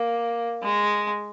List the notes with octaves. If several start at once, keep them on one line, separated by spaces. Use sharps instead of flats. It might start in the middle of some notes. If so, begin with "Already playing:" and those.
Already playing: A#3
G#3